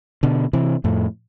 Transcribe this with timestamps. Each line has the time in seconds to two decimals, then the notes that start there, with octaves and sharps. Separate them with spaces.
0.23 B2 D3
0.53 C3 E3
0.84 F2 A2